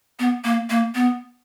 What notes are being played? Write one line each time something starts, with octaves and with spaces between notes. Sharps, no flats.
B3
A#3
A#3
B3